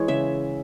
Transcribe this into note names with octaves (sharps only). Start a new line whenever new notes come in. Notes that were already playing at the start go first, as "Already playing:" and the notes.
Already playing: E3 G#3 C#5
C#3 E5